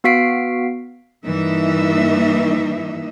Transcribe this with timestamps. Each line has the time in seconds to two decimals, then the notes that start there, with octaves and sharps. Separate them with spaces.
0.04 B3 F#4 F5 B6 C7 D7
1.26 G2 E3 A#3 D#4 E5